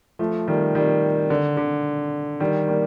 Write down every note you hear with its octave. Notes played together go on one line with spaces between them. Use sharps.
F3 A3
D#3 G3
D#3 G3
D3
D3
D#3 G3
G3 A#3